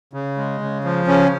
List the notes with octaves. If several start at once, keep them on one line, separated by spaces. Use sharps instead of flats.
C#3
G#3
C#3
F3
C#3 C#4